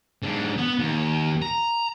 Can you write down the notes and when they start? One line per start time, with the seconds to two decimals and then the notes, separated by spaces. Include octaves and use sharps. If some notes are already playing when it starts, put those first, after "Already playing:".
0.22 G#2 D4
0.58 B3
0.79 D#2
1.42 A#5